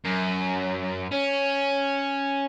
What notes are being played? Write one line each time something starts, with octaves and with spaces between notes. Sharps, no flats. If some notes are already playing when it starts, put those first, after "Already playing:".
F#2
C#4